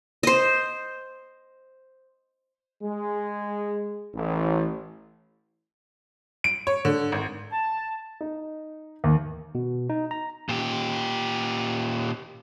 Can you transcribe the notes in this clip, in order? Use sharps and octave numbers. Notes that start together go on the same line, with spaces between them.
C5 D#5
G#3
A1
D7
C#5
D3
G#1
A5
D#4
D#2
B2
D#4
A#5
A#2 G4